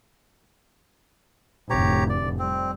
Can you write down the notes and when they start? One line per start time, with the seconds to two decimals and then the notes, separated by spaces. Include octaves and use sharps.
1.70 F1 D2 A2 G4 C#5 A#5
2.09 D5
2.39 F2 G3 C4